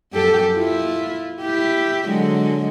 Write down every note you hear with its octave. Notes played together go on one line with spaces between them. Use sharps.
F#2 G4 A4
E4 F4
E4 G4
D3 F#3 G#3